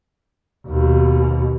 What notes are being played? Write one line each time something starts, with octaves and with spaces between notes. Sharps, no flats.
D#2 B2